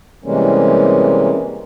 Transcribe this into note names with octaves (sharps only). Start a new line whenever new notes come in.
C3 E3 G3 G#3 A#3 C#4